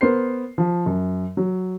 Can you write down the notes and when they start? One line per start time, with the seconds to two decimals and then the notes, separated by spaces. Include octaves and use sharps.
0.01 B3 A#4 C5 C7
0.58 F3
0.86 F#2
1.37 F#3